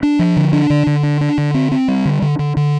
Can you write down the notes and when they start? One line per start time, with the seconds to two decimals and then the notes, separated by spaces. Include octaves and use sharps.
0.03 D4
0.19 F3
0.37 D3
0.53 D4
0.70 D3
0.87 D3
1.03 D4
1.21 D4
1.38 D3
1.54 C4
1.72 C4
1.88 G3
2.05 D3
2.22 D3
2.39 D3
2.57 D3